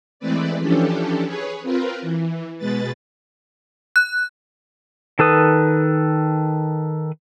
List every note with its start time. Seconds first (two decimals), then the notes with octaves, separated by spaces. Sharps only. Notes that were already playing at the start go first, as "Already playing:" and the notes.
0.20 E3 G#3 A3 C4 B4 D5
0.60 E3 F3 C#4 D4 G4 A4
1.25 G#4 B4 C#5
1.63 C4 F4 A#4 B4
2.02 E3
2.58 B2 G#3 B4 A6
3.96 F#6
5.19 D#3 A4 B4 D#6